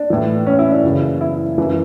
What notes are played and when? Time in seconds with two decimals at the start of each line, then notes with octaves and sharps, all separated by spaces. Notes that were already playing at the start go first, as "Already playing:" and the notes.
Already playing: D4
0.10 A2 E3
0.47 C#4
0.59 E4
0.71 D4
0.83 F#2 C#3 E3
1.21 E4
1.58 F#2 E3